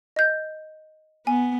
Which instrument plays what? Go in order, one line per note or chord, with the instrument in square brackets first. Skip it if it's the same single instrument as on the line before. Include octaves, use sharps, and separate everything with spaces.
[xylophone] D#5 G6
[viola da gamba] B3 [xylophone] G#5